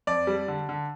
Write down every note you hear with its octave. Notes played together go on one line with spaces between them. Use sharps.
F2 D5
G3
D3
D3